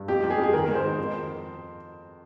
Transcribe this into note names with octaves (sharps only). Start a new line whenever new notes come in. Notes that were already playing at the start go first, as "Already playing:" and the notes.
Already playing: G2
F2 G4
F2
G#4
F2
G#4
D#3 A#4
G#2 A#4
C5
D#3
F2